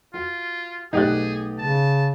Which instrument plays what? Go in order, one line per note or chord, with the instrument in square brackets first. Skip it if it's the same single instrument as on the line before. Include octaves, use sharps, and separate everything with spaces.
[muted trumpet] F4 [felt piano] F#4
[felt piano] B1 A3 F#6 [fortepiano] D#4 G4 D5 [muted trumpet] G#4
[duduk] C#3 [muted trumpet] A5